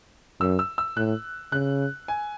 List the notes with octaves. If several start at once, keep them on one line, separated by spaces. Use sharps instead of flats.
F#2 E6
E6
E6
A2 F#6
C#3 F#6
G#5